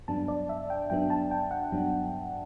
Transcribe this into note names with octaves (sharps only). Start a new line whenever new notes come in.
G2 F#3 B3 D4 A5
D5
E5
G5
G2 F#3 B3 D4 G5
A5
G5
F#5
G2 F#3 B3 D4